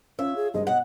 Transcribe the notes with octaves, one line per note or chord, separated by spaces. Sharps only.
C#4 F4 C#5 E5 F5
G#4
G#1 G2 G#3 D#5
B2 D#5 F#5